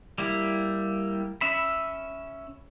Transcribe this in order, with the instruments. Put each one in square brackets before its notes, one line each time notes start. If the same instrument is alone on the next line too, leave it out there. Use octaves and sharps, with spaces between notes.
[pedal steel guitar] G3 A#3 E4
C#4 E5 B5